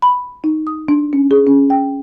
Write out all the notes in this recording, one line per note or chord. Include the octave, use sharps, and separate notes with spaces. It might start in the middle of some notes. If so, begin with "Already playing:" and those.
B5
D#4
D#6
D4
C#4
G#4
C#4
G5